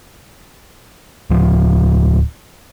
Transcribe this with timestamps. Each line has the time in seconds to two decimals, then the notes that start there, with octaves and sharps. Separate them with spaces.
1.31 D1 F3